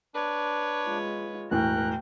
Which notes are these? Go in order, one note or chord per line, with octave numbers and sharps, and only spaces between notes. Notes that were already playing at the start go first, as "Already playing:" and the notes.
D4 B4 C#5
G#3 F4
E1 A2 A#4 G5 F#6